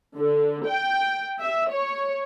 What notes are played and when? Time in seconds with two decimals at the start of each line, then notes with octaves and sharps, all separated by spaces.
0.16 D3
0.67 G5
1.41 E5
1.71 C#5